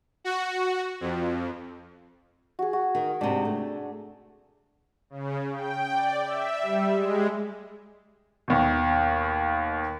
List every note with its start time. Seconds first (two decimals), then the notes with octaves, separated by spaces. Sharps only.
0.24 F#4
1.01 F2
2.59 F#4 G#4
2.73 F#4
2.95 D#3
3.21 G#2 C3 D4
3.45 A3
5.10 C#3
5.52 G5
5.93 D5
6.25 E5
6.59 G3
6.93 G#3
8.48 D#2 B2